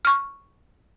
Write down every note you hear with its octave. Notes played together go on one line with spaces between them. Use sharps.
C#6 F6